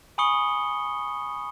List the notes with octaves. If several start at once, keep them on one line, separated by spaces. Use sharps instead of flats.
G#5 B5 C#6 D#6 C#7 G7